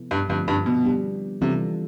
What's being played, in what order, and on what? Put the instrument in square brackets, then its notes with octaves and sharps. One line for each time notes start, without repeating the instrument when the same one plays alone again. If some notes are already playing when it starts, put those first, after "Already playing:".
Already playing: [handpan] C3 F3 B3 E4 A4
[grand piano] G2
[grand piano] G2 [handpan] D3 F3 A3 C4 F4
[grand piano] G2
B2
[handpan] G3 B3 D4 G4
[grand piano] C3 [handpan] E3 G3 D4 F4 A4